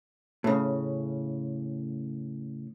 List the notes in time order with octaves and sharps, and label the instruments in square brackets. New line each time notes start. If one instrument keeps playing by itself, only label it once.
[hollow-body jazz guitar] A2 C#3